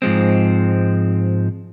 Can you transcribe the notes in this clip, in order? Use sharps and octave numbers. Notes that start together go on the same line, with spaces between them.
G#2 F3 G#3 C4